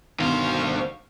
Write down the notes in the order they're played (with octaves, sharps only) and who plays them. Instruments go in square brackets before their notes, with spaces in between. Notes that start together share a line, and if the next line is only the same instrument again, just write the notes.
[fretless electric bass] G1 B2 D#3 [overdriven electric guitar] D2 C5 [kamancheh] F5 C#6